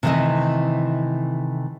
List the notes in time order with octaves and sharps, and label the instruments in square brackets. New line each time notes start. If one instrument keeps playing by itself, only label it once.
[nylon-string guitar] C3 D#3 E3 A3 E4 D#5